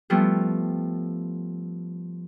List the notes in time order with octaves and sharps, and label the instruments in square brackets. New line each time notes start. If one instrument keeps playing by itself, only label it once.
[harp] F3 G3 A3 B3 E4